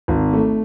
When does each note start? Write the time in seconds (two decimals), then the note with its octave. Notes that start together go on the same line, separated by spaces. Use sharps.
0.08 G#1
0.33 A3